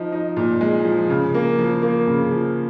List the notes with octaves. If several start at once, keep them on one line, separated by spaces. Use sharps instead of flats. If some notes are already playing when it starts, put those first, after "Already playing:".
Already playing: F3 D#4
D#4
A#2
G#3
F3
C#3
A#3
F3
A#3
C#3
F3